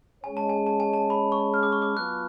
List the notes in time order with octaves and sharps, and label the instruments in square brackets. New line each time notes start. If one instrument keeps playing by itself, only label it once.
[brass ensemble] G#3 C#4 G#4 C#5 [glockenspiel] G#5
[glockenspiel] A5
G#5
A5
G#5
A5
B5
C#6
F6
D6
C#6
D6
[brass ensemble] F#3 B3 F4 [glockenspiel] F#6